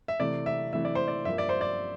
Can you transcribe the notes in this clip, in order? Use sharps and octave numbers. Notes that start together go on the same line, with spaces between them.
E5
C3 E3 A3 D5
E5
C3 E3 A3 E5
D5
C5
D5
G2 F3 A#3 E5
D5
C5
D5